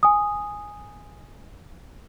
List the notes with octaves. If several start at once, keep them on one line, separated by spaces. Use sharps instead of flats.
G#5 D#6